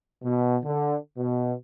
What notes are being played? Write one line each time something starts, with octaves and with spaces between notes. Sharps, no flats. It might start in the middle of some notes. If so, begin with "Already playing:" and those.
B2
D3
B2